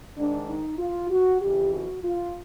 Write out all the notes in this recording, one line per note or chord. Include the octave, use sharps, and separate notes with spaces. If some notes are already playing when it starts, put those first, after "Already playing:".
G#2 D#3 D4
D#4
F4
F#4
F2 C#3 E3 G4
F#4
F4